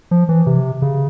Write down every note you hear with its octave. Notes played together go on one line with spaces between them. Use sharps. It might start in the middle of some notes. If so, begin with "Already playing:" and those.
F3
E3
C3
C#3